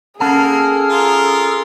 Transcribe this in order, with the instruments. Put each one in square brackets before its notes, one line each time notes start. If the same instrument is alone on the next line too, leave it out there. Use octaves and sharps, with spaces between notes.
[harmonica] A#3 [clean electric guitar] C#4 F#5 A5 [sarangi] G#4 [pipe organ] A4 F6
[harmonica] F4 A#4